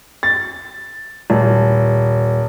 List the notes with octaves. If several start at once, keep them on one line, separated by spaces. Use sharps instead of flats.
A6
D#1